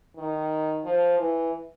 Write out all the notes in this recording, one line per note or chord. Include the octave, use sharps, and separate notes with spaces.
D#3
F3
E3